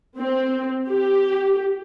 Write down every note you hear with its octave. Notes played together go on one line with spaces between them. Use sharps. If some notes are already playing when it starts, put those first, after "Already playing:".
C4
G4